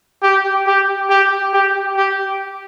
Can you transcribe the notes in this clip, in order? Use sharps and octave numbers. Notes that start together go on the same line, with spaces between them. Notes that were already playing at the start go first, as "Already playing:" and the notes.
G4
G4
G4
G4
G4